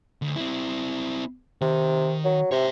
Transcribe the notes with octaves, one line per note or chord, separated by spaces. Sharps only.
D2
C4 E4
C3 D#3
F#3
C3 C#5 E5